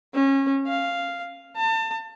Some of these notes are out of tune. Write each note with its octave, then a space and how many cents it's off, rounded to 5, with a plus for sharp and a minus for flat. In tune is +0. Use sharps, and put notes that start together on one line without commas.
C#4 -25
F5 -5
A5 +30